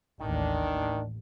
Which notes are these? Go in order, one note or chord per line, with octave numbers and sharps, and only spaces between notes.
A1 D#2 D#3 D4